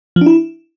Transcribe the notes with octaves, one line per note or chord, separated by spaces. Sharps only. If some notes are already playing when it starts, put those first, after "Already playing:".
F3
D4
E4